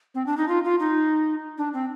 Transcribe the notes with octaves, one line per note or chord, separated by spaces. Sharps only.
C4
D4
D#4
F4
F4
D#4
D4
C4